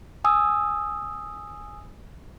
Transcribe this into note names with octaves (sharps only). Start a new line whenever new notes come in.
G#5 D#6 E6